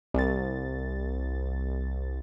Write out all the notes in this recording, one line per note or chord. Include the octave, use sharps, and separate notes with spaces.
C2 A6